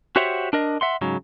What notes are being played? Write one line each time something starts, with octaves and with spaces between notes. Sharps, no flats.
F#4 G4 C5 C#5 E5 F#5
D4 A#4 D#5
E5 F#5 C6
G#2 C#3 F#3